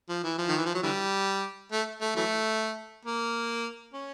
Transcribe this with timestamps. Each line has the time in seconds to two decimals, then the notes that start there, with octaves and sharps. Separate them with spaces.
0.09 F3
0.24 E3
0.38 F3
0.48 D#3
0.57 E3
0.65 F3
0.75 F#3
0.83 D3 E3 G3
1.72 A3
2.01 A3
2.16 E3 F#3 A3
3.05 A#3
3.94 C#4